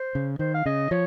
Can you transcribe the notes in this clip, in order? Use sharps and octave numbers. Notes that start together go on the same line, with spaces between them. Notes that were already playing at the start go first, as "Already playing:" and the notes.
Already playing: C5
C#3
D#3 C5
F5
C#3 D#5
F3 C#5